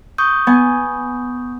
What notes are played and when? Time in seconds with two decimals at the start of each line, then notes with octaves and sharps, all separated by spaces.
0.18 C#6 D#6 G6
0.47 B3 G#5